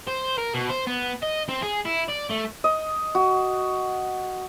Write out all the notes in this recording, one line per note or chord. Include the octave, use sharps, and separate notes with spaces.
C5
A#4
B2
C5
B3
D#5
C4
G#4
E4
D5
A3
D#5
F#4